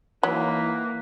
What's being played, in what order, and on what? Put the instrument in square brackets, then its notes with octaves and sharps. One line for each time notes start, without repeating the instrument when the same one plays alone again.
[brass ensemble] E3 D#4 E4 [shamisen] F#3 [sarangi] A#3 [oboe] B4